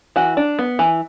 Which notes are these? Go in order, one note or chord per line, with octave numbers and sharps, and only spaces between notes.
E3 F#4
D4
B3
E3